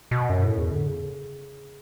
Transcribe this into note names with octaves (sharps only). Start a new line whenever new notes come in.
B2
F#2
A2
E2
D3
C#3